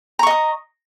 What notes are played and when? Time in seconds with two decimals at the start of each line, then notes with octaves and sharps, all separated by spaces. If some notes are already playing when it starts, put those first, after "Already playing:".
0.19 A#5
0.23 C#6
0.27 D#5
0.30 D#6